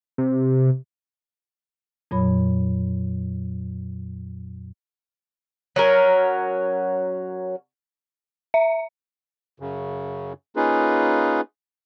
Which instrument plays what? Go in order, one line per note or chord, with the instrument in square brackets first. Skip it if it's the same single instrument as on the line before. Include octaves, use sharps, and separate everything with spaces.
[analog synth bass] C3
[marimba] F2 A#2 F#3 C#5 B5
[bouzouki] F#3 C#4 A#4
[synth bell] E5
[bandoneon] F#2 C#3
A#3 C#4 D#4 F4 G#4 B4